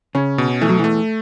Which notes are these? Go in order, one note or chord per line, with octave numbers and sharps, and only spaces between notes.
C#3 C#4
B2
E3 A3
F#3
E2 E3 A3